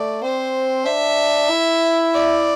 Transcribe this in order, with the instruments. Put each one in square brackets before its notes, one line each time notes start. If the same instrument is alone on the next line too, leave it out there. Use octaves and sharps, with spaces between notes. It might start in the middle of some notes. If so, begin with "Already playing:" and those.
Already playing: [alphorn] A3 [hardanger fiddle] D5
[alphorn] C4 [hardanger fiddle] C5
[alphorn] D4 [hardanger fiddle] E5
[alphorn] E4
[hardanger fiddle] D5